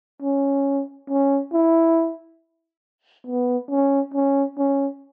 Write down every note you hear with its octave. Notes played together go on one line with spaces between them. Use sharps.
C#4
C#4
E4
B3
C#4
C#4
C#4